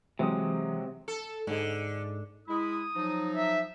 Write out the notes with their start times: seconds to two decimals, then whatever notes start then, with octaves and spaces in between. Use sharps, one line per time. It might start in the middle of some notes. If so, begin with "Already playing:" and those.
0.19 C3 E3 F#3 G#3 C4 D#6
1.08 A4
1.47 G#2 D3 G#3
2.48 G#3 E4 D#6
2.95 F3 F#3 D#4
3.35 E5